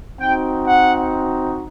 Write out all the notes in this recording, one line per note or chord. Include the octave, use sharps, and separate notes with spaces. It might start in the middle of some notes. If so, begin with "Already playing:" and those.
C4 D#4 F#4 G5
F#5